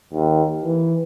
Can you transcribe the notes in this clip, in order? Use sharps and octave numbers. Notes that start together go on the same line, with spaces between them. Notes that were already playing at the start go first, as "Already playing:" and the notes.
D#2
E3